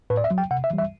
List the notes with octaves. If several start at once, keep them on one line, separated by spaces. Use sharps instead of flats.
A2 B4
D5
E5
F#3
G5
C3 F#5
E5
E3 G3
E5